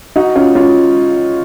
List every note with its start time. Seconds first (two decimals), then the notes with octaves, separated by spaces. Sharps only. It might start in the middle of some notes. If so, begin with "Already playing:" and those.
0.16 D#4 F#4
0.35 C#4 F4
0.55 C#4 F4